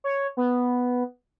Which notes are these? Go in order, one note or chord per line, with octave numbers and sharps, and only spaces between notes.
C#5
B3